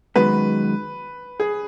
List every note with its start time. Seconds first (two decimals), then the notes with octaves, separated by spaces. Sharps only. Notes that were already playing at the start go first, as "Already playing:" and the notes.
0.15 F#2 D#3 G#3 B3 F#4 B4
1.40 G#4